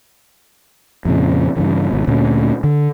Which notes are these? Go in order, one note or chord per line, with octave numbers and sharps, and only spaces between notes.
F2 A#2 C#3
G2 C#3 E3
G#1 B2
D2 A#2 A3 C#4
D3